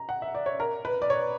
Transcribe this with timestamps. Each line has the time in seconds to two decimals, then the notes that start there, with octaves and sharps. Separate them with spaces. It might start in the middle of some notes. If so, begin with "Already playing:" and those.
Already playing: A#5
0.09 F#5
0.22 E5
0.35 D5
0.46 C#5
0.60 A#4
0.85 B4
1.02 D5
1.10 C#5